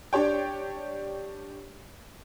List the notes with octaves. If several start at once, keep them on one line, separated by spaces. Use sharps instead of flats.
D4 G4 C#5 G5